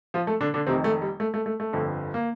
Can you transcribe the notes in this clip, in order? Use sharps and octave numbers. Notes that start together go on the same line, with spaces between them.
F3 F4
A3 A4
D3 D4
D3 D4
F1 F2 C3 D#3 C4
A3
G3
A3
A3
A3
A3
G1 F2 D3 F3
A#3